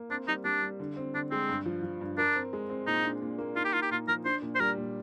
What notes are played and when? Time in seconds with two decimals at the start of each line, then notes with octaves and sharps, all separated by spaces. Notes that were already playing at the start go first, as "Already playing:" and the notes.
Already playing: A#3
0.10 C4 D4
0.28 G3 D#4
0.45 G3 D4
0.62 G3
0.80 D3
0.97 C4
1.14 D3 D4
1.31 G#3 C4
1.49 G2
1.66 F3
1.83 F3
2.01 G2
2.18 D4 A#4
2.35 C4
2.53 G#3
2.69 C4
2.87 A#2 D#4
3.04 D4
3.22 A#2
3.39 A#3
3.56 D#4 F4
3.65 G4
3.73 D#4 F4
3.82 G4
3.91 A#2 F4
4.08 F3 A#4
4.25 D4 C5
4.42 A#2
4.55 C5
4.60 G3 A#4
4.77 A#2